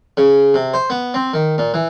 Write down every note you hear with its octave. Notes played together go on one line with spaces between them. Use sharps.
C#3
C3
C5
B3
C4
D#3
A#2
E3